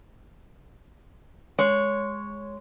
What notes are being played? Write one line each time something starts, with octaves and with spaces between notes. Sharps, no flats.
G#3 C#5